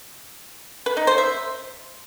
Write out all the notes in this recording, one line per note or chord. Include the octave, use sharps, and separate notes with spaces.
B4
D#4
C5
E5